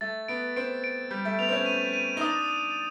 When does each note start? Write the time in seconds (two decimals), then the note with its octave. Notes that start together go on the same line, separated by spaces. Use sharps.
0.01 A3 A6
0.28 B3 D7
0.56 C4 D7
0.84 D7
1.11 G3 G6
1.25 A3
1.39 B3 F7
1.49 C4
1.53 C#4
1.66 D#7
1.93 D#7
2.17 D#4
2.21 D4 D#6
2.49 D#6